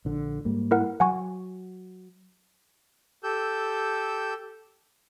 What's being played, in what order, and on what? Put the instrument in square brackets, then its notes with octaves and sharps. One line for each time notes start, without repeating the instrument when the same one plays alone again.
[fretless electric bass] A#1 D3
G#2 G3 A#3
[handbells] E4 A#4 F#5
[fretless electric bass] F#3 [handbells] F#5 G#5 C#6
[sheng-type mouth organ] G4 A4 E6 G6